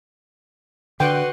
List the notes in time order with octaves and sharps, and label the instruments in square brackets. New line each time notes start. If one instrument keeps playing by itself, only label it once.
[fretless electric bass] D3 [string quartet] F#4 F#5 C6 [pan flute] B4 [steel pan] G5